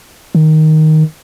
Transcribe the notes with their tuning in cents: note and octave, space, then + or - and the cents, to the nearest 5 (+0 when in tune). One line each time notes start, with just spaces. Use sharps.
D#3 +5